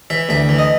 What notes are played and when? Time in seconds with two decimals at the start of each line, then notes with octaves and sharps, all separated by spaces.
0.10 E3 E5
0.29 D2 E5
0.49 E3
0.59 D#5